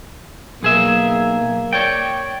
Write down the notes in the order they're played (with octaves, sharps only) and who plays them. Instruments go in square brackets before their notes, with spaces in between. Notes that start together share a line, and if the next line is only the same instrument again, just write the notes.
[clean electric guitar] B1 G#4 E5 [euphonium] A#3
[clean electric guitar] C#5 D5 G5